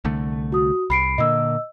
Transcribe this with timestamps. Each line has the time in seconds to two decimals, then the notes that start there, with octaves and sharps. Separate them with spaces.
0.05 C2 D3 A3
0.52 F#4 D#6
0.90 C2 B5 C7 D7
1.18 A#2 D3 A#3 D#5 E6